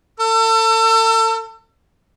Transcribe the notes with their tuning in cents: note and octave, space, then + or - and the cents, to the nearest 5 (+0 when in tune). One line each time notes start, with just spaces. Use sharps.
A4 +40 E6 +30